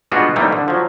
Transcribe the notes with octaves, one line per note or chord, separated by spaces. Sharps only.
G3 G#3 B3 D4 F4 F#4
E3 G3 A3 A#3 C4 D#4
D3
F3 F#3